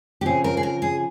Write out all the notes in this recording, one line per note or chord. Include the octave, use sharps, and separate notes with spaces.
G4
C#3 F3 C4 G#4
A#4
G#4
A#4
G#4